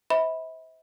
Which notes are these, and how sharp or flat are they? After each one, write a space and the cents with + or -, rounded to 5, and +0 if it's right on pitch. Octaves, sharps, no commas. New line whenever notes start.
C5 -15 E5 -35 B5 +0